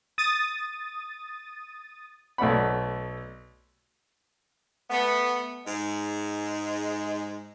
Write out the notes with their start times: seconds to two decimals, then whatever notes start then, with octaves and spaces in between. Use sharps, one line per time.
0.18 D#6 A6 D#7
2.38 B1 A3 D5 F#5 B5
4.90 A3 B3
5.66 G#2 G#3